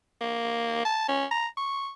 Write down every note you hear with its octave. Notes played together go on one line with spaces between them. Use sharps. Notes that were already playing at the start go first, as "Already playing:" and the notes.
A#3
A5
C#4
A#5
C#6